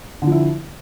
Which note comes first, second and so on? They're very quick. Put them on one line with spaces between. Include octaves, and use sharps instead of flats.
D3 F3 E4